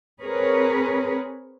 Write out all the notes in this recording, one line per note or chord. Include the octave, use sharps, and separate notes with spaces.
C4 G#4 A#4 B4 C#5